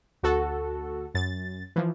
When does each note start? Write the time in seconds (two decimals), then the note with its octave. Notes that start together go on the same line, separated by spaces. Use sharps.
0.23 D2 F#4 A4
1.14 F#2 A6
1.76 E3 F3